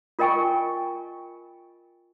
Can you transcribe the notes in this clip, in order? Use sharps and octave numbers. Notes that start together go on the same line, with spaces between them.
F4 A#4 D#5 G5 G#5 C#6